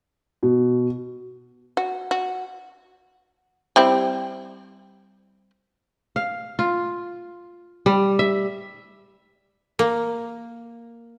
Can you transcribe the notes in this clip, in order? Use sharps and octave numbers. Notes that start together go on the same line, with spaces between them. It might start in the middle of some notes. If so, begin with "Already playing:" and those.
B2
F#4
F#4
G3 C4 E4
F5
F4
G3
E5
A#3